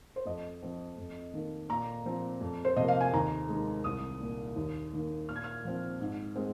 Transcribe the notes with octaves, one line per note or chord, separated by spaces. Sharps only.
C5
F2 D#5
F3 C4
F2
D#3 A#3
A#2 A#5
F3 C4
F2
C5
C3 F3 A#3 D#5
F5
G#5
D#2 A#5
D#3 G#3
C2 D#6
A#2 A#3
D#2
D#3 A#3
A#2 F6
G#6
F6
F3 C4
G#2
G#3 C4